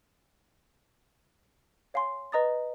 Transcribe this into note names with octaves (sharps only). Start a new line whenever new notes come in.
C#5 F5 G#5 C6
B4 D#5 A#5 D#6 A6